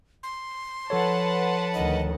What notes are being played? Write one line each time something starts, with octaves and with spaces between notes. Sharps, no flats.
C6
F3 A4 B4 C#5 F#5 A5
D2 D#3 D#5